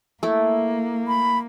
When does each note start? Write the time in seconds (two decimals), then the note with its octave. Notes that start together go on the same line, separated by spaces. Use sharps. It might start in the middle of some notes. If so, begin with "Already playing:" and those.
0.23 A3 A#3 E4
1.08 B5